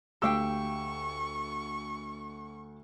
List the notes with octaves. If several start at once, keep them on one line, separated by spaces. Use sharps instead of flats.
D2 G4 F5 G5 C#6 E6